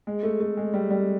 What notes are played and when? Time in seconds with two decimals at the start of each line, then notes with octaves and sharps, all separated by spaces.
0.07 G#3
0.23 A3
0.40 A3
0.57 G#3
0.74 G3
0.90 G3